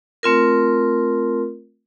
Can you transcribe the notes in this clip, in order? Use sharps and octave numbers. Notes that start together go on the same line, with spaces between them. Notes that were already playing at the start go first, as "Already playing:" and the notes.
A3 C4 F4 A#4